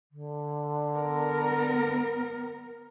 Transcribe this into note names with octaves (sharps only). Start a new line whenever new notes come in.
D3
B3 A#4